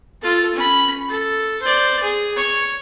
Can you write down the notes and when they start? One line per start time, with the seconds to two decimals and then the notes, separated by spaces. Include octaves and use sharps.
0.22 F4 A4
0.55 C#4 B5
1.09 A4
1.62 C5 D5
2.02 G#4
2.36 C#5